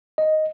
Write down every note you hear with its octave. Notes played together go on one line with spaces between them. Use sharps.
D#5